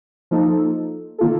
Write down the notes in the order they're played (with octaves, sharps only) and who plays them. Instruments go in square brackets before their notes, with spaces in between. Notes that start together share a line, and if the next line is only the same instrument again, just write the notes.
[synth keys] F3 A#3 D#4 A4
D#3 A#3 F4 A4